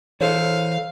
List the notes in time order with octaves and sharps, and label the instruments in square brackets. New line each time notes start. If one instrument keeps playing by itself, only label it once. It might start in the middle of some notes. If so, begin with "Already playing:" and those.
[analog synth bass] E3 [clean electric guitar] A4 C5 C#5 [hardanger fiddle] F5